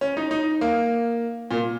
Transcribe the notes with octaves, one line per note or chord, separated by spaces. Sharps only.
C#4
D#4
D#4
A#3
A#2